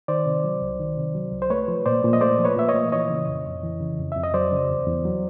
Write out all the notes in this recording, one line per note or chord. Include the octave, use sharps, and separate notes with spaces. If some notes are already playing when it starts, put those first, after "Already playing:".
D#3 C5 D5
C3
F#3
C2
D#3
C3
F#3
C2
C5
A3 B4 C#5
F3
A#2 C5 D5
A#2
D#5
A3 C5 D5
F3
B4 C#5
A#2 E5
C#5 D#5
A#2
E3 C#5 D#5
C#3
F2
F2
E3
C#3
F2
F2 E5
D#5
F#3 C5 D5
C#3
E2
E2
F#3